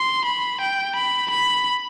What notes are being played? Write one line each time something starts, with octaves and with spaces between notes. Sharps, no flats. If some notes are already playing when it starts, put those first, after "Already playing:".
Already playing: C6
B5
G5
B5
B5